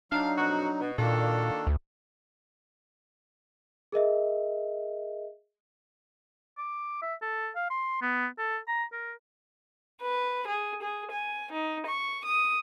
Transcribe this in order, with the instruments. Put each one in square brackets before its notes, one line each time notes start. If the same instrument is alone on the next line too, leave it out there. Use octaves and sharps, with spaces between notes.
[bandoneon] F#3 D#4 [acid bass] D4 [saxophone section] F5
[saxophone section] F2 B2 F#4
B2
[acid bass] A#2 [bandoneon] D#3 A#3 D4 [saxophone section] F4 F#4 A4
[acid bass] D2
[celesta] G#4 A#4 D#5 E5
[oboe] D6
E5
A4
F5
C6
B3
A4
A#5
A#4
[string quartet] B4
G#4
G#4
G#5
D#4
C#6
D#6